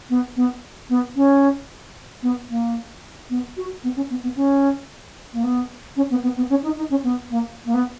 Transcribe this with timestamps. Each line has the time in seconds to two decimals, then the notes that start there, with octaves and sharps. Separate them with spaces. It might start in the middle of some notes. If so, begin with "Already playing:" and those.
0.10 B3
0.36 B3
0.89 B3
1.16 C#4
2.22 B3
2.49 A#3
3.30 B3
3.57 F#4
3.83 B3
3.96 C#4
4.10 B3
4.23 B3
4.36 C#4
5.33 A#3
5.44 B3
5.96 C#4
6.10 B3
6.23 B3
6.37 B3
6.49 C#4
6.62 D#4
6.76 D#4
6.90 C#4
7.04 B3
7.30 A#3
7.65 A#3
7.74 B3